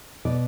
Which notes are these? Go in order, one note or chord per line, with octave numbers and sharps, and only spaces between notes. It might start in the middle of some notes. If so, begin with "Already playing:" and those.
B2 B4 D5